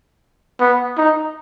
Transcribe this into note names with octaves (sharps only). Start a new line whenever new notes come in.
B3
D#4